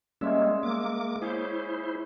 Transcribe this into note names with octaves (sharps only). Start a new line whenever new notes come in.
G3 G#3 A#3 C#4 E5
A#3 D6
E4 G#4 C5 C#5